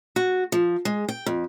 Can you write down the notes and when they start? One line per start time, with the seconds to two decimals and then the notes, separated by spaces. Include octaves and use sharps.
0.16 F#4
0.52 F3
0.85 G#3
1.09 G5
1.26 F2